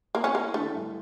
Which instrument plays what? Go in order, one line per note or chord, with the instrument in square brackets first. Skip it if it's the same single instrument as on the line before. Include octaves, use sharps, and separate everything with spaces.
[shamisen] A#3 [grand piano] E4
[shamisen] C#4
[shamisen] A#3 [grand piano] E4
[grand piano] D3 [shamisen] A3
[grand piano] G2